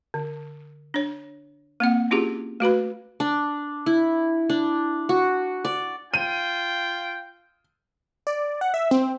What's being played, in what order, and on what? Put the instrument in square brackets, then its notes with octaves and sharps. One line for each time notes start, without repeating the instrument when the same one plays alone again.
[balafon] D3
D4 C#5
A#3 C4 F#5
C#4 E4 F4 G4 G#4
A3 F#4 B4 B5
[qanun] D4
E4
D4
F#4
D5
[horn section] F4 G5 [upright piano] D#7
[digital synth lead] D5
F#5
E5
C4